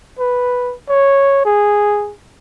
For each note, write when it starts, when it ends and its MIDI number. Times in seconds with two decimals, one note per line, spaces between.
0.19 0.74 71
0.89 1.43 73
1.45 2.14 68